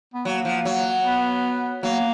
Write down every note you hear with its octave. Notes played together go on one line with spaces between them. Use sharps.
B3
F#3 A#3
F3
F#3
B3
F#3 A#3